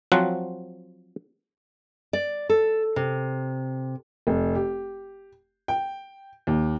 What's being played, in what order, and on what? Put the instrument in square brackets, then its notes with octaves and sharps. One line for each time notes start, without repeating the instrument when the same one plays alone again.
[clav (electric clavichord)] F3 F#3 C4 F#5
[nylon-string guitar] D5
A4
C3
[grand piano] F1
G4
G5
D#2